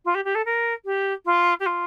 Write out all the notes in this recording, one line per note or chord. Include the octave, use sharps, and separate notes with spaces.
F4
G4
G4
A4
A#4
G4
F4
G4
F4